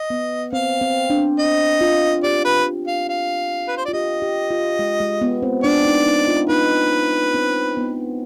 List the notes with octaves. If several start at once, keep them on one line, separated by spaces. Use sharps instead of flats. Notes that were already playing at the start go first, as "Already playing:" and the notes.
Already playing: D#5
B3
C4 F5
C4
D4
D#5
F4
G4 D5
B4
F5
F5
B4
C5
F4 D5
G4 D#5
G4
F4
G#3
G#3
B3
C4
D4 D5
D#4
D#4
F4
D#4 B4
C4
B3